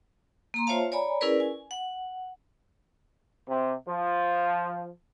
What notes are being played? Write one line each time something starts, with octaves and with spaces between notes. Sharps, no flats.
A#3 A#5 C6
F4 C5 C#5 E5 F5 A5
C#5 D5 G#5 A#5 B5
C#4 E4 G#4 A#4 B4 D5
G#5
F#5
C3
F3